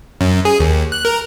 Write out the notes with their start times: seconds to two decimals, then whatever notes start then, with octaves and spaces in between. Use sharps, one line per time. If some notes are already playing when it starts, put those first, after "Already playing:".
0.21 F#2
0.45 G#4
0.60 D#2
0.92 F#6
1.05 A#4